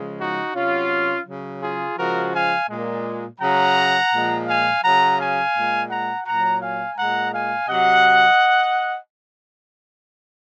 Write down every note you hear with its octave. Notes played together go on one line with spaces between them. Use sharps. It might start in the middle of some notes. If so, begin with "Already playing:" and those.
Already playing: C#3 F3 G#3
D#4 F#4
C3 F#3 C#4 F4
C#3 F#3
F4 G#4
C#3 F3 G#3 F#4 A#4
F5 G#5
A#2 G#3
C#3 F#3 F#5 A#5
A#2 F3 G#3
F5 G#5
C#3 F#3 F#5 A#5
F5 G#5
A#2 G#3
F#5 A#5
A#2 F#3 F#5 A#5
F5 G#5
A#2 G#3 F#5 A#5
F5 G#5
C3 F#3 D#5 F#5